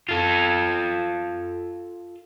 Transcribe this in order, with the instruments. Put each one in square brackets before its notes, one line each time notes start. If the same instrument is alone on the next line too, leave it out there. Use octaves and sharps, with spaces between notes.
[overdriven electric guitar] F4 A4